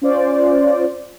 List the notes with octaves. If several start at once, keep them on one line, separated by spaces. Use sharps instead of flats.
C#4 F4 C5 D5